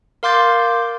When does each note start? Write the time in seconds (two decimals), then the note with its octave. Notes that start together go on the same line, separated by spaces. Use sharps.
0.23 A#4 F5 C6 D6 G6 A6